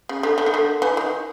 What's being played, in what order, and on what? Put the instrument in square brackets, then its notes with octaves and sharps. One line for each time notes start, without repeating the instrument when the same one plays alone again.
[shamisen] C#3
D3
D3
D#3
D3
E3
D#3